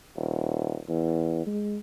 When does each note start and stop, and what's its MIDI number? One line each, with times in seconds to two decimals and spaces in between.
0.16 0.80 27
0.89 1.46 40
1.47 1.77 56